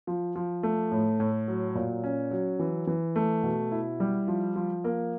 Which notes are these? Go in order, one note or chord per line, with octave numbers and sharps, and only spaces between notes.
F3
F3
A3
A2
A2
F#3
A#2
C#4
F#3
E3
E3
A3
B2
E4
G3
F3
F3
A#3